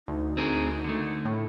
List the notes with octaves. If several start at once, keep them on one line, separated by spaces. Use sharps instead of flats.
D2 D#4
C4 G#4 A#4
D3 A3
A2